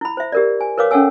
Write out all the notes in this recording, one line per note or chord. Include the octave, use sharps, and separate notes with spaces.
E4 B5
C5 E5
G4 A#4 D5
G#5
A#4 B4 C#5 F5 D6
C#4 A4 C#5 F#5 G#5 E6